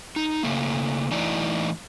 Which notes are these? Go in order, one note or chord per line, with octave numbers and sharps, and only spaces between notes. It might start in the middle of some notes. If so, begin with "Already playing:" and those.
D#4
C#3 A3 A#3
E3 A3 D#4 E4 D5